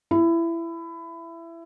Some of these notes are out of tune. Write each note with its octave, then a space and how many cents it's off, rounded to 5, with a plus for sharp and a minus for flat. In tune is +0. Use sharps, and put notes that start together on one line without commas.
E4 +20